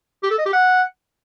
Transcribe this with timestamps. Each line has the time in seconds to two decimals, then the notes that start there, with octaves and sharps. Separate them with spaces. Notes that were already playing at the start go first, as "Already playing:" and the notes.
0.23 G4
0.30 A4
0.38 D#5
0.46 G4
0.53 F#5